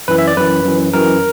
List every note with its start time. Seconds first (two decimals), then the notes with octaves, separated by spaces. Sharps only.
0.08 F#2 E3 B4
0.18 E5
0.28 D5
0.37 F#2 E3 B4
0.65 F#2 E3
0.93 F#2 E3 A#4